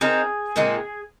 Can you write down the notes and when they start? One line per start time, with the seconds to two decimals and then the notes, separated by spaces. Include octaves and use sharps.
0.01 C4 D#4 G#4 A#4
0.56 A#2 G#3 C4 D#4